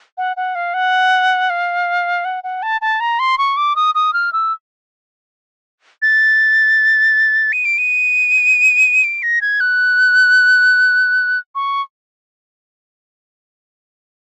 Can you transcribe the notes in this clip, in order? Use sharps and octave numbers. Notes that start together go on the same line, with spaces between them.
F#5
F#5
F5
F#5
F5
F#5
F#5
A5
A5
A#5
C6
C#6
D6
D#6
D#6
F6
E6
A6
D#7
D7
D#7
D7
A#6
G#6
F#6
C#6